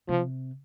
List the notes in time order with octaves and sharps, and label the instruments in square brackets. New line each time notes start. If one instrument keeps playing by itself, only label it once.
[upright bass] C3 [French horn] F3